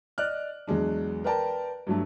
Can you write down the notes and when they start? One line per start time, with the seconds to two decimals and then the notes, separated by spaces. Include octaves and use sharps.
0.18 D5 D#5 F6 F#6
0.68 E2 F#3 G#3 D4
1.24 A#4 B4 D5 G5 A5 A#5
1.87 G2 F#3 A3